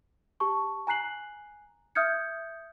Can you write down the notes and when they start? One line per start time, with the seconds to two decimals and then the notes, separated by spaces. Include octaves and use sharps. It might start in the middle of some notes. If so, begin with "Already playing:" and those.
0.40 G4 A5 C#6
0.87 G#5 A#5 F#6 C7 F#7
1.95 E5 D#6 F6 G6 G#6 C#7